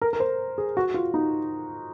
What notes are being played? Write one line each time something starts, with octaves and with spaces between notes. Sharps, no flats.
A#4
A#4
C5
G#4
F#4
F4
D#4